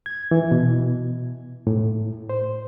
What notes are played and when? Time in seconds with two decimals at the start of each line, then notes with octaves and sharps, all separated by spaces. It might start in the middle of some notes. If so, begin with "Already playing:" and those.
0.06 G#6
0.31 E3
0.51 B2
1.67 A2
2.29 C5